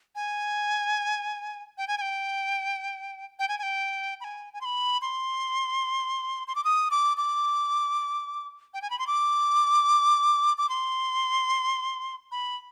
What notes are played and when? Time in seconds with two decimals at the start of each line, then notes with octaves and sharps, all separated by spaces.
0.15 G#5
1.78 G5
1.88 G#5
1.98 G#5
2.01 G5
3.39 G5
3.49 G#5
3.59 G#5
3.63 G5
4.20 B5
4.24 G#5
4.53 G#5
4.61 C6
4.65 B5
5.02 C6
6.48 C6
6.55 D6
6.64 D#6
6.91 D6
7.17 D6
8.74 G5
8.82 G#5
8.90 B5
8.99 C6
9.07 D6
10.58 D6
10.69 C6
12.32 B5